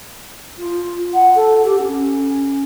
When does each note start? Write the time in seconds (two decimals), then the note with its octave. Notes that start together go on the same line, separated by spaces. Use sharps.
0.58 F4
1.14 F#5
1.35 A4
1.64 G4
1.79 C#4